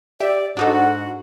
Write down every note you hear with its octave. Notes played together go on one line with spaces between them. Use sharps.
G4 D5 E5
G#2 D4 D#4 F#4 A4 F#5